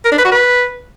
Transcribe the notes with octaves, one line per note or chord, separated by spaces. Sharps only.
A#4
D4
B4
F#4
B4